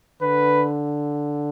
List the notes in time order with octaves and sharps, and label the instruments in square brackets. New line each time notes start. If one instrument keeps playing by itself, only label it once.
[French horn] D3 [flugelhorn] B4